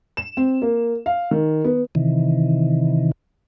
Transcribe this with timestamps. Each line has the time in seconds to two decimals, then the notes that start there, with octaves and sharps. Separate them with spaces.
0.17 E7
0.37 C4
0.62 A#3
1.06 F5
1.31 D#3
1.65 B3
1.95 C3 D#3 E3